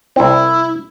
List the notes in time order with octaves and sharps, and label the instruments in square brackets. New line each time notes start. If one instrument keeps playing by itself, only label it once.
[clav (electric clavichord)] C2 C4 [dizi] E4